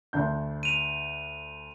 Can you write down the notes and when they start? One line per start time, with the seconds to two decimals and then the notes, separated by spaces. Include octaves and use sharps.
0.13 D2 D4 G6
0.63 D#7 F7